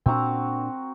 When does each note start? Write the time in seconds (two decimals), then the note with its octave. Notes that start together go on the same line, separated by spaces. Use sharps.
0.06 A#2 C4 D4 F#4 A#5